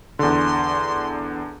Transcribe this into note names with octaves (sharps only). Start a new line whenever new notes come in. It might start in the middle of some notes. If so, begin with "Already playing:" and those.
E2 D3 C6